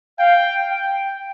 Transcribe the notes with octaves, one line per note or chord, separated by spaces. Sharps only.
F5 G5
G5